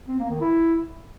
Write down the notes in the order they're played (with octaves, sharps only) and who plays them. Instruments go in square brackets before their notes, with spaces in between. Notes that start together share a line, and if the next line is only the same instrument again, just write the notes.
[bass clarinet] C4
A#3
D#3
E4